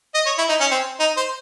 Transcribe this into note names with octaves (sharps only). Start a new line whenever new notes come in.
D#5
C#5
E4
D#4
C#4
C4
D#4
C5